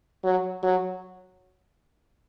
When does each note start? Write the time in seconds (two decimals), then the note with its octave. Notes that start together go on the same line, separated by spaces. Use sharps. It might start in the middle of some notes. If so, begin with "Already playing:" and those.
0.24 F#3
0.63 F#3